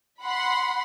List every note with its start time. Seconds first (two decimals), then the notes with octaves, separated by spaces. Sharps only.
0.24 F#5 B5 C6